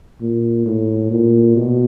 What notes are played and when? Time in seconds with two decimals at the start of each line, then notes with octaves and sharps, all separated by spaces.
0.21 A#2
0.66 A2
1.11 A#2
1.56 B2